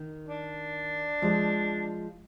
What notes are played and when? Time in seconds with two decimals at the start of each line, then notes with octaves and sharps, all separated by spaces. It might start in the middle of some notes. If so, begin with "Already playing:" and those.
Already playing: D#3
0.29 D4
1.22 F3 G#3